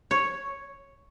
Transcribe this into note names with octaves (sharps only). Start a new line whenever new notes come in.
C#5